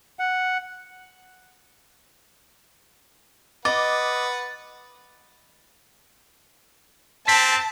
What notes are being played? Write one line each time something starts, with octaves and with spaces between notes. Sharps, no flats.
F#5
B4 D#5 F#5 D6 A6
C4 A5 B6